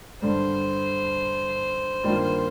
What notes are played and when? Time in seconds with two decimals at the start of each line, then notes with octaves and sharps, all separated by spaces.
0.22 G2 D3 G3 C5
2.04 G2 D#3 G3 A#3 F4